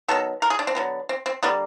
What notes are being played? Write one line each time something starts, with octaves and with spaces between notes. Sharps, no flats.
D#3 F#3 B3 A4
A#4
G#4
D4
C4
D3 F#3 B3
C4
C4
D3 G3 A#3 B3